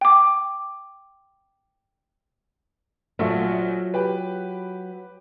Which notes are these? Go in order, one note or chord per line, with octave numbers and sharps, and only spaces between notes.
G5 D6
A#1 F#3 A3 F4 E5
G4 B4